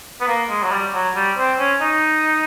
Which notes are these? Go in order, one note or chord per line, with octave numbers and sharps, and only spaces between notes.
B3
A#3
G#3
F#3
G3
F#3
G3
C4
C#4
D#4